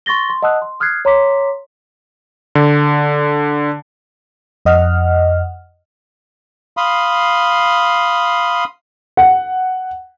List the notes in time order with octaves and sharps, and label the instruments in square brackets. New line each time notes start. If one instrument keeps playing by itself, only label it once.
[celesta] C6 C#6 A6 A#6 G7
C6
D#5 F#5 A5 D#6 E6 F#6
C6
D#6 F6 F#6 G#6 C7
C#5 A#5 C6 D6 B6
[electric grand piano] D3
[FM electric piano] F2 D#5 F#5 F6
[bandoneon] F5 B5 C6 D#6
[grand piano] F#5